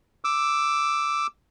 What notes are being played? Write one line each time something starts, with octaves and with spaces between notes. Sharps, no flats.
D6 E6